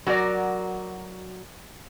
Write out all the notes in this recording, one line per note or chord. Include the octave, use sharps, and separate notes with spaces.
F#3 F#4 A#4 D5